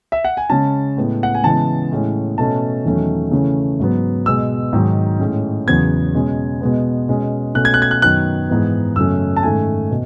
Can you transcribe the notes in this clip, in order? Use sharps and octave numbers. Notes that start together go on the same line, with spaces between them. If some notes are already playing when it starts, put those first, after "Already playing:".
E5
F#5
G#5
C#3 G#3 C#4 A5
A2 G#3 B3
F#5
G#5
C#3 E3 G#3 B3 A5
A2 G#3 C#4
B2 A3 C#4 A5
E2 D#3 F#3 A3 C#4
C#3 E3 A3 C#4
G#2 F#3 B3
B2 G#3 B3 E6
G#2 D#3 F#3
A2 G#3 C#4
E2 C#3 F#3 B3 G#6
B2 G#3 C#4
B2 G#3 B3
B2 G#3 C#4
B2 A3 C#4 F#6
G#6
F#6
G#6
F#6
F#2 D#3 F#3 B3 F#6
G#2 E3 B3
F#2 C#3 F#3 A3 C#4 E6
A5
G#2 D#3 A3 C#4 G#5
B2